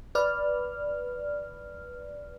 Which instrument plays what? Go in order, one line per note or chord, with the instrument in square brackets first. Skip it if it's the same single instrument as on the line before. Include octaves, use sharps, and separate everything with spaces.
[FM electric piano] B4 D5 F6